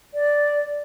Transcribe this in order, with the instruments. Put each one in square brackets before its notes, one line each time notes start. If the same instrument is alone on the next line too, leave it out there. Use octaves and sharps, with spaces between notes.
[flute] D5